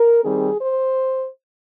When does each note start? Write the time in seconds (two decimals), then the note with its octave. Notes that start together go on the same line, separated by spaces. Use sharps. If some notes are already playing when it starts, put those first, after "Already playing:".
Already playing: A#4
0.24 D#3 G3 C4 G#4
0.60 C5